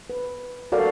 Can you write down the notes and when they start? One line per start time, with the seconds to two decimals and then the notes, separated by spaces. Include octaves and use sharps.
0.10 B4
0.72 F#4 A4 A#4 D5 F5